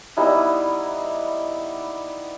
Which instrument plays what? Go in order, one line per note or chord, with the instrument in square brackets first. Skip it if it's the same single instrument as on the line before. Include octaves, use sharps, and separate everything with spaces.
[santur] G3 B3 D#4 E4